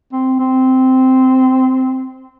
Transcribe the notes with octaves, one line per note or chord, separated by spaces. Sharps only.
C4
C4